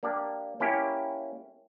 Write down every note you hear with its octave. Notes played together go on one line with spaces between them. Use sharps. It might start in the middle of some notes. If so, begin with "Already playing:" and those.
A#3 D4 G4 D5
A#3 C#4 E4 G4